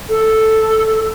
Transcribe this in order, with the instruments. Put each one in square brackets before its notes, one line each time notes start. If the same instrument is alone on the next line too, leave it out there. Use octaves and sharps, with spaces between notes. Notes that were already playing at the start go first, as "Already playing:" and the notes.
[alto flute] A4